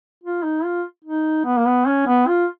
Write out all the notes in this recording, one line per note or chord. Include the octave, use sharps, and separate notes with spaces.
F4
D#4
F4
D#4
B3
A#3
B3
C#4
B3
F4